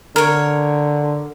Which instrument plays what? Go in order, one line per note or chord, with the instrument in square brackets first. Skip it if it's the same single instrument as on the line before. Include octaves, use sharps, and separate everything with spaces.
[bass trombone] D3 [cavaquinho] A#4 C#5